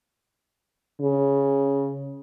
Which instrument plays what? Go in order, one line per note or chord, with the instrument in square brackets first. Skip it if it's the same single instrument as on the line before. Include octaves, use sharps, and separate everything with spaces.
[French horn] C#3